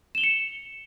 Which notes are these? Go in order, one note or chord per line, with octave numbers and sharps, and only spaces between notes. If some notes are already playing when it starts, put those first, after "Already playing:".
C#7 E7 F7 G7